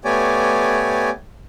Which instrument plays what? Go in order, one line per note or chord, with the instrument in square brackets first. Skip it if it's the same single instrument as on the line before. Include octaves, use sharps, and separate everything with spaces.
[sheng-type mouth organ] A3 B3 G4 C#5 D5 G#5